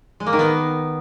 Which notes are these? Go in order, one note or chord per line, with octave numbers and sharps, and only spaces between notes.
G#3
A#3
D#3
B3